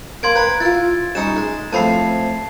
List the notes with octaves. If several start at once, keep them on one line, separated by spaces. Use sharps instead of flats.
A#3 C6 G#6 D7
B4 G5 A#5
E4 F4 A6
G3 C#4 D#4 E7
G#3
A2 F3 C4 A5 B5 C7